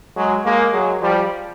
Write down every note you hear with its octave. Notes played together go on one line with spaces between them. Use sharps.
F#3 G#3
G#3 A#3
F#3 G#3
F3 G3